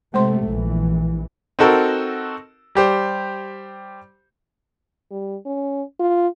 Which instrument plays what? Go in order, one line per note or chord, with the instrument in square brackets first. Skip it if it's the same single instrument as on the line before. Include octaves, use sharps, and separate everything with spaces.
[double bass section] C3 A3 [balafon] G#3 C5 C6
[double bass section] A#1 E3
[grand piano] C4 D#4 F#4 A4 A#4
G3 G4 C5
[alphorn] G3
C#4
F4